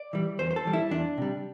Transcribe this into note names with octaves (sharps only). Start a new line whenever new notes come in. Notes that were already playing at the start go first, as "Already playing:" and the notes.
Already playing: D5
E3 G3
E2 C5
C5
A4
E3 G3
E4
E2 D4
C3 G3